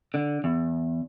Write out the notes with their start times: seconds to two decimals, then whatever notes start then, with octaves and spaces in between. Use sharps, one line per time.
0.14 D3
0.44 E2